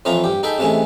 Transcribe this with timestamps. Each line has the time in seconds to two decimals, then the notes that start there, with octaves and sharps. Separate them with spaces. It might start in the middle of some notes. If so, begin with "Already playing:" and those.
0.05 F2 E3 F3 F4 C#5 A#5
0.24 G2 G4
0.43 D#4 G#4 A4 G5 B5
0.58 C3 E3 G#3 A3 C#4